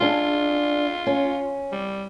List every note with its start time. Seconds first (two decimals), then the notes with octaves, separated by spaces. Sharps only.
0.01 D4 F4 G#4
1.07 C#4
1.72 G3